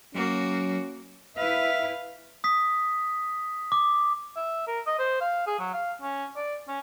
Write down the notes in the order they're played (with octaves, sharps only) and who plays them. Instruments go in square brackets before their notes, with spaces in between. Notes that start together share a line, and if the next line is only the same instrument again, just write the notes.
[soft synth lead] F#3 [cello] A#3 F#4 [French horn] C#4
[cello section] E4 B4 [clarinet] E5 [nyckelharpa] F5
[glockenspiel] D#6 B6
D6
[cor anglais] E5
A#4
D#5
C5
F5
G#4
F#3
F5
C#4
D5
C#4